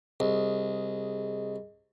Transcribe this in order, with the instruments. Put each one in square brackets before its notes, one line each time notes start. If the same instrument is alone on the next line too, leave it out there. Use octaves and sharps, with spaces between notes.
[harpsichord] C2 [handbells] G#4 D#5